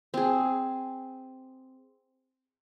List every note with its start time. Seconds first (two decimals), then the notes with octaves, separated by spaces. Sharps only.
0.14 C4 G#4